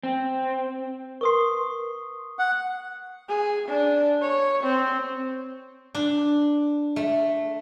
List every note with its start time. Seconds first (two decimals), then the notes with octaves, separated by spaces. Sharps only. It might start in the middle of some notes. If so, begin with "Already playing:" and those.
0.03 C4
1.21 A#4 B4 C6 C#6 D#6 C7
2.39 F#5
3.29 G#4
3.69 D4
4.22 C#5
4.64 C4
5.95 D4
6.96 A3